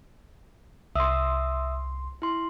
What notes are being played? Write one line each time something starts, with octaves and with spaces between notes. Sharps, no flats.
C2 E5 C6 D#6 E6
E4 C6